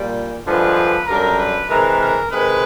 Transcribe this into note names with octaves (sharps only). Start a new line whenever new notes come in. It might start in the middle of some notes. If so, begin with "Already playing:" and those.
Already playing: A#2 G3
G2 D3 F3 G#3 B4
F#2 D3 G3 A#4
B4
C3 E3 G#3 A#4
A#4
C3 D#3 G#3 B4